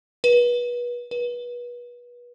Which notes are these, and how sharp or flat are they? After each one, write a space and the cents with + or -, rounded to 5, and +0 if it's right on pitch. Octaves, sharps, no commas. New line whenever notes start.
B4 -30
B4 -30